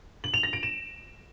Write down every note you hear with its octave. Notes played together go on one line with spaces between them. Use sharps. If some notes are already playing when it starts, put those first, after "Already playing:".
F#7
F7
A#6
D7
E7